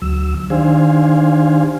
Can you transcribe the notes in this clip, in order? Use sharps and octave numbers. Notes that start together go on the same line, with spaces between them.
D2 F#3 E6
D#3 D4 G4 C5 F5 G#5